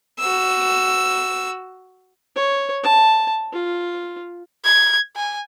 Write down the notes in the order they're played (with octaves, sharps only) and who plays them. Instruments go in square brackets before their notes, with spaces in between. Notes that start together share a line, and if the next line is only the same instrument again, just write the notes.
[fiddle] F#4 E6
[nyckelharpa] C#5
A5
F4
[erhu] G#6
G#5